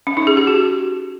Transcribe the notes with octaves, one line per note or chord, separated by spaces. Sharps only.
C#4
D#4
G#4
G4
F#4